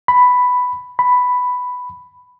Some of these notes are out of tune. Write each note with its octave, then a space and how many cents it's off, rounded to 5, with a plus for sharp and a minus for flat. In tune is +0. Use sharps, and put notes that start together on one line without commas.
B5 +5
B5 +5